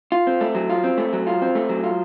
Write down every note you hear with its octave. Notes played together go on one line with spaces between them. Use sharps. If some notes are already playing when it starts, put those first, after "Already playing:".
F4
C4
A3
F#3
F4
C4
A3
F#3
F4
C4
A3
F#3
F4